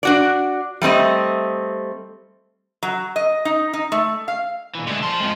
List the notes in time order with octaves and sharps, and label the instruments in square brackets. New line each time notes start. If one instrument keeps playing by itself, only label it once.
[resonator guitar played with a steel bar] D4 F#4 D5
G3 A3 C4 D#5
F#3
D#5
D#4
D#4
A3
F5
[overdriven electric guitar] A#2 E3
[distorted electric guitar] D3 [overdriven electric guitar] G#3 A3
[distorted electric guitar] F3 C6 [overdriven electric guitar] A5
[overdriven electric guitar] G#3 C4